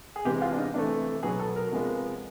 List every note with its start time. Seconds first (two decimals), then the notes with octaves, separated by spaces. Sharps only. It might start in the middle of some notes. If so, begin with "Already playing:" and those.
0.16 G#4
0.25 C3 E3 G#3 G4
0.42 F4
0.52 D4
0.58 D#4
0.74 C3 E3 A3 D4
1.23 B2 F#3 B3 G#4
1.39 A4
1.56 A#4
1.72 C3 F3 G#3 B3